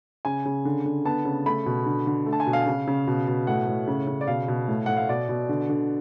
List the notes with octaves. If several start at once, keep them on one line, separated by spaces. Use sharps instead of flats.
C#3 G#5
C#3
D3
D3
B3 A5
C#3
A3 B5
B2
D3
D3
A3
A5
G#5
B2
F5
C#3
C#3
B2
B2
A2 F#5
A2
C#3
C#3
D5
B2 F5
B2
A2
A2 F#5
F5
B2 D5
B2
D3
D3